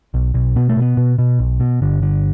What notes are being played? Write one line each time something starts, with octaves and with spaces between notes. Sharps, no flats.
B1
B1
B2 B3
A3
B2 B3
B2
B2
B1
B2
G1 D3
D3